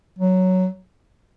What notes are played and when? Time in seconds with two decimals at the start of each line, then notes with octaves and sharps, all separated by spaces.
0.19 F#3